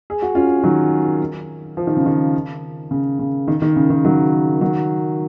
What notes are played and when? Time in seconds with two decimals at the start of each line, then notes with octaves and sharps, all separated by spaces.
0.10 G#4
0.22 F#4
0.35 C#4 F4
0.63 D#3 F#3
1.77 F3
1.87 D#3
1.97 C#3
2.06 D#3
2.91 C#3
3.19 C#3
3.48 D#3
3.62 D#3
3.76 C#3
3.90 D#3
4.05 D#3 F#3
4.61 D#3 F#3